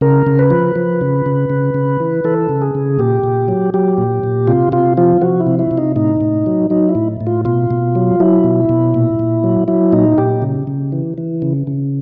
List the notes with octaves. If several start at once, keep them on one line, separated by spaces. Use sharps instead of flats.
C#3 A#4
C#3
B4
F3
F3
C#3
C#3
C#3
C#3
E3
E3 A4
C#3
G#4
C#3
A#2 G4
A#2
F#3
F#3 G4
A#2
A#2
C3 F4
C3 F4
F3 F4
F3 F#4
E4
C3
E4
C3
D#4
A2 D#4
A2
F#3
F#3 D#4
E4
A2
A2
F4
B2 F4
B2
F#3
F#3 E4
B2
B2
A#2
A#2
F#3
F#3 E4
A#2 D#4
A#2 G4
C#3
C#3
E3
E3
C#3
C#3